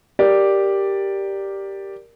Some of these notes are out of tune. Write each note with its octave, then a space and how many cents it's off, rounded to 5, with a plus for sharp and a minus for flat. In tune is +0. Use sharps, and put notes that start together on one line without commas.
G4 +0 A#4 +0 D5 +0